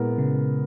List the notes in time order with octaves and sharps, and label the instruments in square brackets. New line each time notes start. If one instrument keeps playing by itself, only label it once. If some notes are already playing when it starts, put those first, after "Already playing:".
Already playing: [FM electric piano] A#2 [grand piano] G#3 B3 E4 A#4
[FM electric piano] C#3